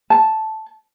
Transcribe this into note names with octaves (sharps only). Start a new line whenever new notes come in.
A5